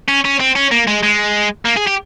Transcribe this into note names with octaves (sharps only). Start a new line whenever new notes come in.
C#4
C#4
C4
C#4
A#3
G#3
G#3
A#3
G#4
G4